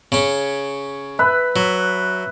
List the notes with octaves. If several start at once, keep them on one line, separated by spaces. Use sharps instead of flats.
C#3 C#4
B4 E5
F#3